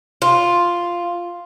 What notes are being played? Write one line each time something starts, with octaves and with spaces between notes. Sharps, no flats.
F4